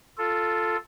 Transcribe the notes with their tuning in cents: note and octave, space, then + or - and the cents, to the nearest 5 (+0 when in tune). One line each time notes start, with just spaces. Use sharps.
F4 +0 A4 +0